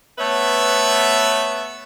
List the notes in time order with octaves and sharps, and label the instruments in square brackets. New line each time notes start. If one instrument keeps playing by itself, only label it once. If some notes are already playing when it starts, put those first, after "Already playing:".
[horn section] A3 B3 B4 C#5 E5